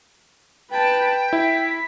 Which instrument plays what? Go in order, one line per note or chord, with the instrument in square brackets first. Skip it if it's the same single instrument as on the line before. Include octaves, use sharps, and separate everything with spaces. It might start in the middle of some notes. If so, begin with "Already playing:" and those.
[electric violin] B4 A5 [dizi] G5
[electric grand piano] E4 [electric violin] B6